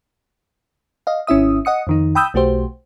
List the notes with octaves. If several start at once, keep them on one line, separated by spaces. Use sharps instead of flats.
D#5 F5
G#1 C#4 E4 E5 D#6
D#5 F#5 D#6 C#7
F2 D#3 D#4
G5 B5 D#6 E6 G6
B1 A3 F#4 G4 C5